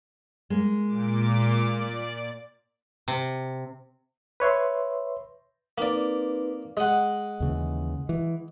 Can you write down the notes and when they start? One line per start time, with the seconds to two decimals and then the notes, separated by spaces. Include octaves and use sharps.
0.50 G#3 A#3
0.86 A#2 D6
1.64 D5
3.08 C3
4.40 B4 C#5 E5 C6
5.78 A#3 C4 D#4 B4 D5
6.77 G#3 D#5 F#5
7.40 D#2 C#3 E3
8.09 E3